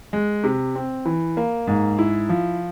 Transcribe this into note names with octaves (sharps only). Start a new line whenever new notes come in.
G#3
C3
C4
E3
A#3
G#2
E4
F3